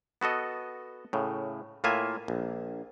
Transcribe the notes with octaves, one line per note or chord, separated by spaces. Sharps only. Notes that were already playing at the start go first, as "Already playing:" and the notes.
B3 F#4 A4 D#5
A2 C#3
A2 A#3 F4 E5 G#5
A#1